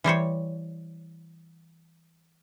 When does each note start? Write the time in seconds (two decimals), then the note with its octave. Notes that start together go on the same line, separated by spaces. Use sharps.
0.04 E3 G3 C5 C#5